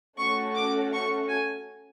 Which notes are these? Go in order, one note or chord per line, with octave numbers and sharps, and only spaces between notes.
A3 C#4 F#4 A4 C#6
D6
C#6
G#5